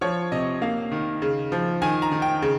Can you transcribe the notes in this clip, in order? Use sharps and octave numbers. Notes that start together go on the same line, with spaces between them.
F3 C#5
C3 D#5
A#3 F5
D#3
C#3
F3
D#3 G#5
A#5
D#3
G5
C#3